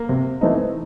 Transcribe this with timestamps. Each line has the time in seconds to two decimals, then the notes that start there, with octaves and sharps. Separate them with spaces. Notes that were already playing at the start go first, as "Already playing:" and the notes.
Already playing: A#3
0.09 C3
0.41 E3 A3 C4 D#4